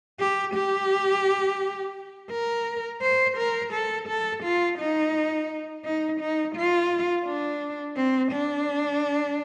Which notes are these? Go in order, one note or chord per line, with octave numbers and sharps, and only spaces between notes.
G4
G4
A#4
C5
A#4
A4
A4
F4
D#4
D#4
D#4
F4
D4
C4
D4